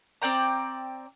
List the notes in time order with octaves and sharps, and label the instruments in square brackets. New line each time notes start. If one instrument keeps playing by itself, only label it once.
[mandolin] C4 D5 G5 A#5